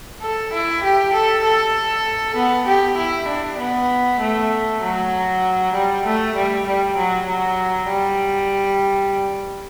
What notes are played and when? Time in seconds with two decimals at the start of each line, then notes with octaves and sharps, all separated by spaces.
0.22 A4
0.53 E4
0.83 G4
1.13 A4
1.44 A4
2.36 B3
2.66 G4
2.97 E4
3.29 D4
3.59 B3
4.20 A3
4.82 F#3
5.73 G3
6.05 A3
6.35 G3
6.66 G3
6.96 F#3
7.27 F#3
7.88 G3